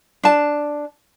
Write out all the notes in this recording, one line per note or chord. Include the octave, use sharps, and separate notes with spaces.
D4 A5